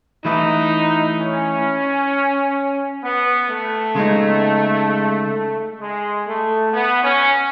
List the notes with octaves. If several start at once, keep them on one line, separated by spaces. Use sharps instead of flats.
E3 A3 D#4 E4
C#4
B3
A3
C#3 G#3 D#4
G#3
A3
B3
C#4